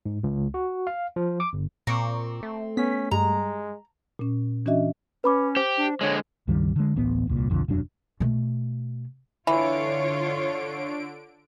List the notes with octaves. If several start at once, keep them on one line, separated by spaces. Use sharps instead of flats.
G#2
C#2
F#4
F5
F3
D6
G1
A#2 C4 A#5 C#6 D6
A3
B3 C#4 B6
G2 G3 G#3 A#5
A#2 C#4
E3 C#4 D4 F#4 D#5 E5
C#4 B4 B5 D6
G4 C5
D4
D3 G#3 C#5
C#2 G2 D#3 G3
D3 G#3
D1 A1 B3
D#1 C2 A#2
B1 F2 D3 F3
E1 F#2 F#3 D4
B2 A3
D3 E3 F4 C#5 D7